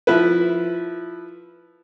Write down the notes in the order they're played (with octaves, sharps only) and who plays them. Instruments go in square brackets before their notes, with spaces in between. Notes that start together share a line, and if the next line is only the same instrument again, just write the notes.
[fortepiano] F3 E4 B4